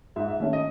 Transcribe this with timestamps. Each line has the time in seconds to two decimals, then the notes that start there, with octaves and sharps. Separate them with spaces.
0.16 G#2 E5
0.28 E5
0.40 D#3 A3 C#4 E5
0.53 D#5